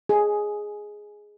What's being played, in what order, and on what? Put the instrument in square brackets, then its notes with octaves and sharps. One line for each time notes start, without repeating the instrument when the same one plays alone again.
[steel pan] G#4